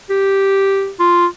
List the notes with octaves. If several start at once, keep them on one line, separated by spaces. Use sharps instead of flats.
G4
F4